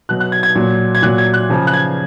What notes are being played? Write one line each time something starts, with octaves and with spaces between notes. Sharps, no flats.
B2 F#3 F#6
F#6
G#6
G#6
A#2 F#3
G#6
A#2 F#3 F#6
G#6
F#6
C#3 F3
F#6
G#6